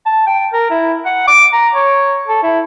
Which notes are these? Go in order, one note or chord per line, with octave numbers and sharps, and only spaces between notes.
A5
G5
A#4
E4
F#5
D6
A#5
C#5
A4
E4